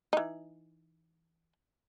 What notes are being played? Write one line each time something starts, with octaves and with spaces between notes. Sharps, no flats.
E3 D#4